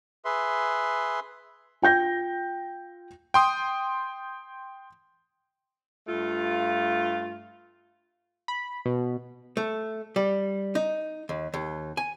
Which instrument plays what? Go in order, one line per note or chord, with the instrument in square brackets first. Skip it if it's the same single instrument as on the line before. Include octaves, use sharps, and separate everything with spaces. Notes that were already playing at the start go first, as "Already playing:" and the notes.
[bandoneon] G#4 B4 E5 C6
[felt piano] F4 G5 G6 A#6
[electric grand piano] G5 C6 D#6
[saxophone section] G2 A3 F4
[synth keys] B5
B2
[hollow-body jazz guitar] A3
G3
D#4
D#2
D#2
G#5